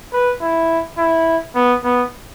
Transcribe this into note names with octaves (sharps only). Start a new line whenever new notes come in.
B4
E4
E4
B3
B3